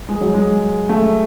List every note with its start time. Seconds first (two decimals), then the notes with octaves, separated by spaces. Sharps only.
0.09 G#3
0.21 F#3
0.34 G#3
0.89 A3